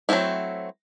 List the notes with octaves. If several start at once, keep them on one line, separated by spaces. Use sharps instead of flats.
F#3 G3 A3 C4 E4